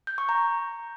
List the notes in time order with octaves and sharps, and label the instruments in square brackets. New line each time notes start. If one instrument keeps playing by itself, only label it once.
[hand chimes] G6
C#6
A#5